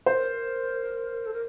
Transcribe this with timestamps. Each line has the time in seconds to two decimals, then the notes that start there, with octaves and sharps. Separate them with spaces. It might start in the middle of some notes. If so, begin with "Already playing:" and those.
0.06 A#4 C5
1.26 A4
1.33 A#4